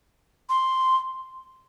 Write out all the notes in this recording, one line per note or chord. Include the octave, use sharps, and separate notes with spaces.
C6